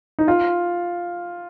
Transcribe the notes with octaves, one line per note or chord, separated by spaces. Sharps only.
D#4
F4